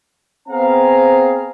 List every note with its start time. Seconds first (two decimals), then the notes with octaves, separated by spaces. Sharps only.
0.49 B3 C4 G#4 F5 A#5